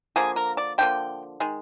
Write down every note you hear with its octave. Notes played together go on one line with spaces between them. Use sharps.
D3 F3 A#3 G#4
A#4
D5
D3 F3 A#3 G5
D#3 G#3